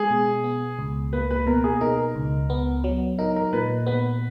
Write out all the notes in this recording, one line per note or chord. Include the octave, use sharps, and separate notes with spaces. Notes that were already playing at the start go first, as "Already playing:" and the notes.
Already playing: G#3 G#4
B2
B3
C#2
A#3 B4
B4
B2 A#4
G#4
D#4 A#4
C#2
B3
F#3
D#4 A#4
A#4
A#2 B4
B3 B4